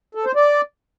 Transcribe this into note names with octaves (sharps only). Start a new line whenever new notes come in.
A4
C5
D5